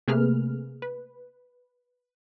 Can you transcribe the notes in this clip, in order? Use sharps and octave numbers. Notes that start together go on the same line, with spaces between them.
C3 A3 A#3 G#4 B4 F6
B4